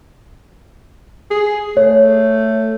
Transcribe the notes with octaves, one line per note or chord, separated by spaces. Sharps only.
G#4
A3 C#5